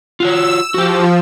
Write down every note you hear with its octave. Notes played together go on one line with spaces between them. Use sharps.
F4 F#4 C#5 E6
F3 F#4 G4